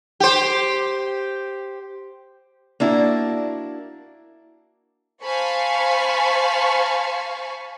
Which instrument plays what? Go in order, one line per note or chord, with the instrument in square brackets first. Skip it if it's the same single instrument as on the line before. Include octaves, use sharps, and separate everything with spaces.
[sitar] G4 C5
[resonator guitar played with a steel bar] A#3 D4 E4 F#4
[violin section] C5 F5 G#5 A5 B5 C#6